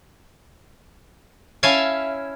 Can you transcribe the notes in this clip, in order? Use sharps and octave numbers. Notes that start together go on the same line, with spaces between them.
C#4 E4 E5 F5 G#5 A5